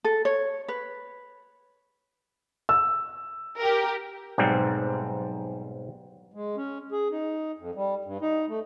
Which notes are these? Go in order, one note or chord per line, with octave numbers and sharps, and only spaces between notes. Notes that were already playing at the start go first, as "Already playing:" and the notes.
A4
C#5
B4
E6
G4 A#4
B1 G#2 G3 C4
G#3
C#4
G#4
D#4
F2
G3
G2
D#4
A3